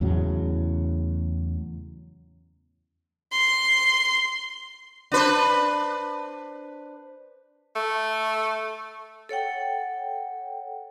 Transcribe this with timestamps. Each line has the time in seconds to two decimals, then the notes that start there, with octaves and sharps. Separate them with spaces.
0.01 E2 A2 C#3 F#3
3.32 C6
5.12 D4 B4 C5
7.76 A3
9.29 A4 C#5 F#5 G5